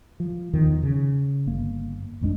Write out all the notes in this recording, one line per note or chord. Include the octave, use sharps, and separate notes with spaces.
F3
E2 D#3 F3
C#3
G1 A#3
A#1 F2 G#3 D4